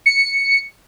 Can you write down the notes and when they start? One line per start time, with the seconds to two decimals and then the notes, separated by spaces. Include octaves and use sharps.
0.06 C#7